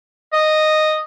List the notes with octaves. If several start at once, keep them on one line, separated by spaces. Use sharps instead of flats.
D#5